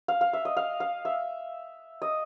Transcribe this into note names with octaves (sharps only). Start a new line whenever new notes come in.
F5
F5
E5
D#5
F5
F5
E5
D#5